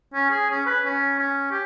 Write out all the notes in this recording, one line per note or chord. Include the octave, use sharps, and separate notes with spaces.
C#4
G#4
C#4
B4
C#4
C#4
G4